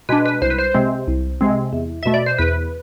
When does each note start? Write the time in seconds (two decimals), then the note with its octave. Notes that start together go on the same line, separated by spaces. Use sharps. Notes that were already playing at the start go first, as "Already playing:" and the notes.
0.09 B2 G#3 D4 B4
0.26 B4
0.42 C2 C5
0.50 B4
0.59 C5
0.74 C3 G#3 C4
1.08 C2
1.41 C3 G#3 C4
1.73 E2
2.03 B2 A3 E5
2.14 D5
2.26 C5
2.38 E2 B4